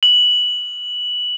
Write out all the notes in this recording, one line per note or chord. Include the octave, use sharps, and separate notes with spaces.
F#7